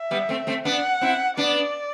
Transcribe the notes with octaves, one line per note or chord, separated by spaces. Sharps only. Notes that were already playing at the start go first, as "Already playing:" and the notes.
Already playing: E5
G3 B3
A3 C4
A3 C4
B3 D4 F#5
C4 E4
B3 D4 D5